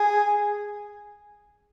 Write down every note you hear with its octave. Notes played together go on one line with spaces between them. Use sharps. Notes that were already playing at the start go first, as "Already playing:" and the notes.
Already playing: G#4